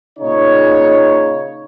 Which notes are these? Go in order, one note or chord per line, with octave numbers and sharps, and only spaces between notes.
A#2 C#3 D#4 C#5